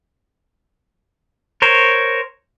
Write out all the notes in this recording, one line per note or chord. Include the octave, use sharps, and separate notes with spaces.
A#4 C5 C#5